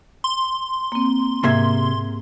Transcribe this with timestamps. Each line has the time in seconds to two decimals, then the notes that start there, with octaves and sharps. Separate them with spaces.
0.24 C6
0.92 A#3 C4
1.44 G#2 C3 A#3 E5 G#6